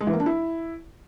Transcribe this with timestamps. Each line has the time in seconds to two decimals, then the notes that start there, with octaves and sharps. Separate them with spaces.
0.01 G#3
0.07 E3
0.13 A#3
0.20 D4
0.26 E4